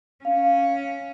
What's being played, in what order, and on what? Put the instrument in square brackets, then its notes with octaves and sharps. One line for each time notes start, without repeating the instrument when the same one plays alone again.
[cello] C#4 [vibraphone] F5